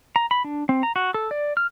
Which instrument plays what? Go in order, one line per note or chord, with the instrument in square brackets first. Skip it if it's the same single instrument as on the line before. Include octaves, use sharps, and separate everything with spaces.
[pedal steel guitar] A#5
B5
D4
C4
A#5
F#4
A4
D5
F6